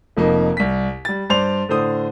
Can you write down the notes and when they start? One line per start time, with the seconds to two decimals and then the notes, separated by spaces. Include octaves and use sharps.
0.17 F1 F2 A#3 D#4
0.57 C2 B6
1.05 G3 A6
1.30 G2 C5 D5 C6 F7
1.69 A2 D3 C5 D#6